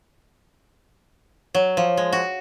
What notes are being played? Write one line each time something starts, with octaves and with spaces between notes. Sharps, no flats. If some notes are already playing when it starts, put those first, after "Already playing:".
F#3
F3
G#3
F#4